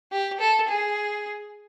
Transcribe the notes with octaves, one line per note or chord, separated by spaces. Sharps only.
G4
A4
G#4